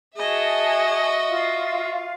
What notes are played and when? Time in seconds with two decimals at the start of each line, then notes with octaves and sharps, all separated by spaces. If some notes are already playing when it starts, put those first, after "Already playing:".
0.17 F#4 G#4 D#5 E5 A5
1.29 F4 F5